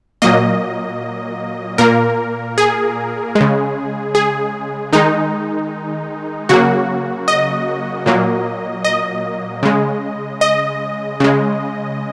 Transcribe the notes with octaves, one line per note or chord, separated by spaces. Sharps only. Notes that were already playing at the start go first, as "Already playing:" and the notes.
A#2 F#3 A#3 D#5
A#2 A#3 A#4
G#4
G#3
C#3
G#4
D#3 G#3 D#4
C#3 F#3 A#3 F#4
D#5
A#2 F#3 A#3
D#5
C#3 G#3
D#5
C#3 G#3